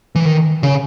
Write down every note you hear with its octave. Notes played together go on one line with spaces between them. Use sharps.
E3
D#3
C#3